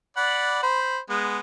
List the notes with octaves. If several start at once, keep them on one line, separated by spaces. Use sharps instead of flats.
D5 F#5 B5
C5 B5
G#3 B3